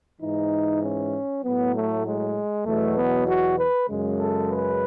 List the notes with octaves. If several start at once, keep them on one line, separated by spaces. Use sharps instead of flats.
G#2 E3 G#3 D#4
C#4
A2 F#3 B3
A3
G#3
E2 B2 F#3 A3
B3
F#4
B4
F#2 C#3 G#3
A4
B4